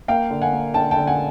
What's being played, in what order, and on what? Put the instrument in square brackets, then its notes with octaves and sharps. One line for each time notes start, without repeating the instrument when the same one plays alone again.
[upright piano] A#3 F5 G5
D3
F#5 G#5
A#3
D3 G5 A5
G5 A5
D3
F#5 G#5